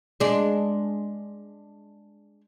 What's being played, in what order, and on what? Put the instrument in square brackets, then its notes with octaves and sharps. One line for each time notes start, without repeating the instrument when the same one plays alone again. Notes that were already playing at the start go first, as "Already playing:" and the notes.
[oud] G#3 D4